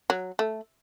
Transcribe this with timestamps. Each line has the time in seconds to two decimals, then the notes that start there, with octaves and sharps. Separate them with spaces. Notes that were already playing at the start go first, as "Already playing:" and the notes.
0.10 F#3
0.39 A3